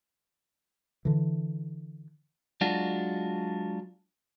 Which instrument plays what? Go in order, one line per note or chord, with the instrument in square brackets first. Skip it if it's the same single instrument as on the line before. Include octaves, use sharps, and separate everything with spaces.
[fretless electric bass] D3 E3
[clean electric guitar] F#3 G#3 D4 F4 F#4